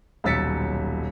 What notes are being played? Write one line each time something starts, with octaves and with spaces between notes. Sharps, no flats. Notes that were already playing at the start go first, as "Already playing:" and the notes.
D#1 B1 E6 A6 B6 C#7